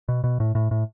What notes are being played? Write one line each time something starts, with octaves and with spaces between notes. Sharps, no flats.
B2
B2
A2
A2
A2